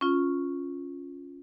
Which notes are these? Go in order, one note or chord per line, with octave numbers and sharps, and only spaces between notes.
C#4 F4